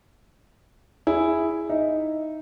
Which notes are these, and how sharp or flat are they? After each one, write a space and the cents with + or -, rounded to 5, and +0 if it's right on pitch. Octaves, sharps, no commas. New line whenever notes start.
E4 +0 G#4 +0
D#4 +0 E5 -5